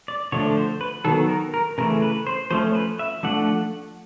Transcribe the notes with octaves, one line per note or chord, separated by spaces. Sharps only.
D5
D3 F3 A3 D4 C#5
C5
B4
D#3 F#3 B3 A4
A#4
A#4
C#3 E3 A3 A#4
B4
C5
F3 A3 C#4 C5
B4
E5
F3 A3 D4 F#5